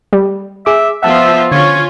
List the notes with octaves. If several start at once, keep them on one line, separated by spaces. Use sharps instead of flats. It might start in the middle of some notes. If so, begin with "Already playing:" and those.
G3
G#4 E5 D6
F3 B3 F4 E5 F#5 A5 E6
D3 C#4 F4 C#5